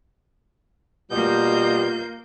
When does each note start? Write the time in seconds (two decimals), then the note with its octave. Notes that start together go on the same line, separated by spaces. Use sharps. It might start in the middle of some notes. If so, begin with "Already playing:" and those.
1.11 B2 G3 A#3 F4 D#5 G6